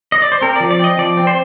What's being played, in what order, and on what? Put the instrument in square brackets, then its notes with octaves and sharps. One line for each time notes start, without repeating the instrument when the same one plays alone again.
[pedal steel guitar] D#5
D5
C5
C4 A#4
F3 D5
D5
C4 D#5
F3 D5
C4
C5